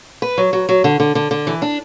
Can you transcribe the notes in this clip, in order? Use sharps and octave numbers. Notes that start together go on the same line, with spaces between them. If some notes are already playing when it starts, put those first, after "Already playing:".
B4
F#3
F#3
F#3
D3
D3
D3
D3
E3
D4